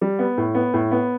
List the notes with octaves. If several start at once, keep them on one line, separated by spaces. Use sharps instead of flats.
G3
B3
A2
B3
A2
B3